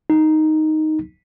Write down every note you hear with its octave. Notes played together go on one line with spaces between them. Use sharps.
D#4